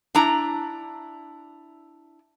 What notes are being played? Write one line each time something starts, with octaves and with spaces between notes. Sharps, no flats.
D4 E4 A#5